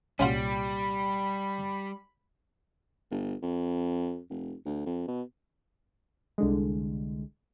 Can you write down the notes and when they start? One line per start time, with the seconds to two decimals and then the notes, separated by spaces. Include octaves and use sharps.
0.19 C2 A#2 G3 C#4 F4 F#4 B5
3.11 G1
3.42 F2
4.30 F1
4.65 D2
4.86 F2
5.08 B2
6.38 C2 D3 G#3